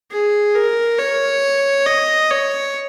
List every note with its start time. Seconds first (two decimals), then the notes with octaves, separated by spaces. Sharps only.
0.11 G#4
0.55 A#4
0.99 C#5
1.86 D#5
2.30 C#5